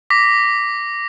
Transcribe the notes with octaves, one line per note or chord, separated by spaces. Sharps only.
D6 A#6 B6